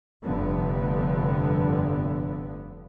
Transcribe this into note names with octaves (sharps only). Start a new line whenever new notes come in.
F1 G2 D3 B3